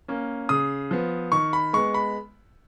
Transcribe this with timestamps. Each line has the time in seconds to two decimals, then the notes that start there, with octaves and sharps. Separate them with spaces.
0.08 A#3 C#4
0.49 C#3 D#6
0.91 F3 B3
1.32 D#3 C#6
1.53 B5
1.73 G#3 B3 C#6
1.94 B5